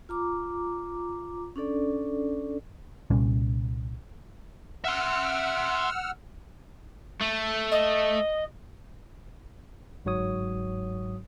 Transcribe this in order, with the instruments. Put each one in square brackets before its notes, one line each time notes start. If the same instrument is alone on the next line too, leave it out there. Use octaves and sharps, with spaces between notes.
[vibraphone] F4 A#5 D6
C#4 D4 A4 D5
[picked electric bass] C2 A#2 G3 C#4
[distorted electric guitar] E5 C6 [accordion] F#5 E6 F6
[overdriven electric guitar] A3
[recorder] D#5
[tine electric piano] G1 G#2 F#3 F#4 C#5 D#6